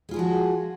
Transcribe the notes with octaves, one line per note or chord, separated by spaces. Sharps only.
F3 G#3 F4 F#4 G#4